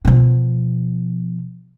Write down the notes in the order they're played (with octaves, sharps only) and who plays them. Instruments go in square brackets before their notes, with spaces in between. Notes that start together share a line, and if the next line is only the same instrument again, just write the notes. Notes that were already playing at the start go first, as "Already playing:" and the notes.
[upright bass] B2 F3